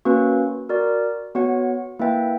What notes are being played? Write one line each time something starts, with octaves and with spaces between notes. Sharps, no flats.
A#3 C#4 F#4 B4
F#4 A#4 D5
B3 F#4 C#5 F#5
A#3 E4 B4 E5 G5